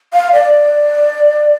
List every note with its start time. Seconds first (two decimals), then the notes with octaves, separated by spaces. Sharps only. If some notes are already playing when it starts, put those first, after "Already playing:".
0.14 F5
0.33 D5